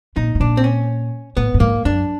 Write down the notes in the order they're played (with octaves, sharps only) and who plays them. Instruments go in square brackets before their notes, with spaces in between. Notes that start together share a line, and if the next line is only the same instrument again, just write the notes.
[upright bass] A#2 [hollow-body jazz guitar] D#4
[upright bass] A2
[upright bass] A#2 [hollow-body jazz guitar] D4
[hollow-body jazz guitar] C4
C#4
[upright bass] A2 [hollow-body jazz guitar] B3
[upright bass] A2
[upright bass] G#2 [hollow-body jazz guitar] A#3
[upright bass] F#2 [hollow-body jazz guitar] D4